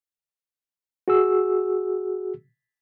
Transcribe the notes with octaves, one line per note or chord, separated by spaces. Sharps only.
F#4 G#4 E6